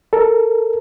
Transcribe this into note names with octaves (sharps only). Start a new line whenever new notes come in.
A4 A#4